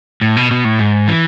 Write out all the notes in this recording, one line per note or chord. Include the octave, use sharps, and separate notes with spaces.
A2
B2
B2
A2
G#2
E3